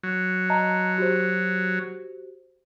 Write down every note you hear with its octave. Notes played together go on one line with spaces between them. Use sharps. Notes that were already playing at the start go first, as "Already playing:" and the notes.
F#3
D#5 A5 A#5
F#4 G4 C5